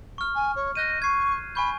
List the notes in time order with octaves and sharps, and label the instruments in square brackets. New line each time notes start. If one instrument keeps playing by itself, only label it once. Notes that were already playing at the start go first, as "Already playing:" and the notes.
[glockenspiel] C#6 F6
[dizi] G#5
C#5
[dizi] D#5 [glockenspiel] F#6 G6 D#7
[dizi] C#6 [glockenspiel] G#6 C7
[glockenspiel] G#5 C#6 G6 [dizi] B5